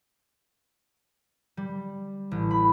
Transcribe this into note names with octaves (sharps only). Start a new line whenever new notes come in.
G3
A1
B5